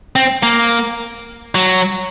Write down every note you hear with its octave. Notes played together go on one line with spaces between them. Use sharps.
C4
A#3
F#3